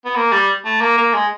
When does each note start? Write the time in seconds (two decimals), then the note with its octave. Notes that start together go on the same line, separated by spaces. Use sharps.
0.05 B3
0.16 A#3
0.32 G3
0.65 A3
0.81 A#3
0.97 A#3
1.14 G#3